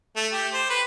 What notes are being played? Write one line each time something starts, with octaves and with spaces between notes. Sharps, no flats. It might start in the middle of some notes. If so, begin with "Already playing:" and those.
A3
G4
C5
B4